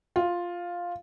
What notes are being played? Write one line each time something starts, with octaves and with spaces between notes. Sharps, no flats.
F4